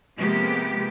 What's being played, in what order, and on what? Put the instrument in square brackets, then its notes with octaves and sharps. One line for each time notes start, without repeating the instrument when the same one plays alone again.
[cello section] C3 F3 G#3 A#3 B3 G4